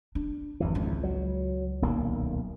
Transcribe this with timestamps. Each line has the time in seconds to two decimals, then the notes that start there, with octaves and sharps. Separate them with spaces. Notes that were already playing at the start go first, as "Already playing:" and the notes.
0.15 D4
0.60 G#1 F2 E3
0.75 C#2
1.03 F#3
1.82 D#1 B1 A#3